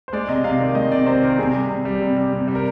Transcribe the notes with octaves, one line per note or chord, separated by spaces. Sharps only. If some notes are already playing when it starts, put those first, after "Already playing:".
C5
G#3 D5
C3 D#5
C3 F5
D#3 D5
G#3 D#5
C3 D5
C3 C5
D#3 A#4
C3 G#4
G3
C3
G3
C3
G3
C3
G3
A#4